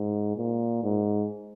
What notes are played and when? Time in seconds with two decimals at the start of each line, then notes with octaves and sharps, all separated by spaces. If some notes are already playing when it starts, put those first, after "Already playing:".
Already playing: G#2
0.37 A#2
0.83 G#2